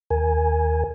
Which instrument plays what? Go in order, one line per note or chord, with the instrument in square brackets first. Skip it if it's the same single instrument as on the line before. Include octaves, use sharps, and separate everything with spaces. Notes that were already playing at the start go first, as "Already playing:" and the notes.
[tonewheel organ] D#2 A#4 G#5